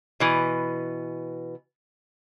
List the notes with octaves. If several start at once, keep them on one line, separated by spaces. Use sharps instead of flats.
B2 E3 B4